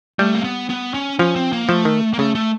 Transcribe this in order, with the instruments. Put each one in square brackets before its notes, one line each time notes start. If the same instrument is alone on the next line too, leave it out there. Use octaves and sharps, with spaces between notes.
[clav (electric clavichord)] G3 [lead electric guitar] A3
[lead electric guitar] A#3
B3
B3
C#4
[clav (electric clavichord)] F3 [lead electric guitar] C#4
[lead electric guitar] C4
A#3
[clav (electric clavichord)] F3 [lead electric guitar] A3
[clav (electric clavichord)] D#3
[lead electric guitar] A#3
[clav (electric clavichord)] C#3 [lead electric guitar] A3
[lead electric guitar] A3